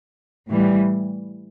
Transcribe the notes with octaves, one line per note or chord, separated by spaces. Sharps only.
A2 E3 G3